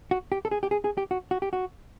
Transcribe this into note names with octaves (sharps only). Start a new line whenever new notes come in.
F#4
G4
A4
G#4
G4
G#4
G#4
G4
F#4
F#4
G4
F#4